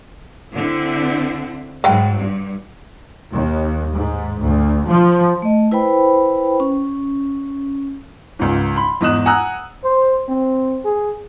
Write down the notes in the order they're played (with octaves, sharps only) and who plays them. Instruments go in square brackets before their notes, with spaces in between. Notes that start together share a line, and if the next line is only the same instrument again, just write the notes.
[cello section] D3 C4 E4
[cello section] G#2 F#3 [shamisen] B4 F5 G5
[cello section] G2
[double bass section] D#2
G#2
D2
F3
[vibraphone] A3 D#5
E4 B4 C5 G5 B5
C#4
[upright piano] C#2 G#2
B5 C6
E2 G#2 D#5 D#6 F#6 E7
F#5 G#5 A#5 D#6 E6 F#6
[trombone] C5
C4
G#4